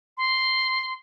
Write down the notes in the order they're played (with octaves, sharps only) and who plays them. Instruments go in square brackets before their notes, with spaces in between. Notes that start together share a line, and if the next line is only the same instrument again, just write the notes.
[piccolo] C6